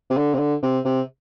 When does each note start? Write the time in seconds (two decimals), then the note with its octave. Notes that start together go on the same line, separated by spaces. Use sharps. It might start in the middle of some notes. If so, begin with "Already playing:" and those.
0.10 C3
0.17 D3
0.34 C3
0.39 D3
0.63 C3
0.85 C3